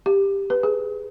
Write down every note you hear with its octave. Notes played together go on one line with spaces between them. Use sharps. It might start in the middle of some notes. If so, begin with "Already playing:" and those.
G4
B4
G#4